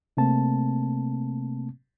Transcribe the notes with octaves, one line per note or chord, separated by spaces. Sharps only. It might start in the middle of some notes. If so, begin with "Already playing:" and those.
C3 A3 A#3 C4 A5